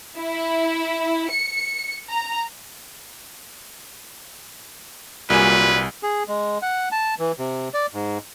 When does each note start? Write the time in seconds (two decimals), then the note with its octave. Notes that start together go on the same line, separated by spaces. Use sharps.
0.18 E4
1.31 C#7
2.10 A#5
5.30 C2 A#2 F#3 G3 B4 G#5
6.03 G#4
6.28 G#3
6.62 F#5
6.92 A5
7.19 E3
7.39 C3
7.74 D5
7.94 G#2